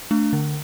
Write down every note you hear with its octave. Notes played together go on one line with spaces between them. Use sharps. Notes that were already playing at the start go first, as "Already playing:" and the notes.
A3 D4
D3